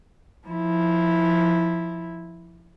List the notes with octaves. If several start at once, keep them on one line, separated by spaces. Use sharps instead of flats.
F3 E4